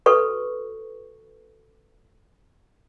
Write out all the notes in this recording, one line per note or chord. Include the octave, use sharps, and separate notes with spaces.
F#4 A4 B4 C#6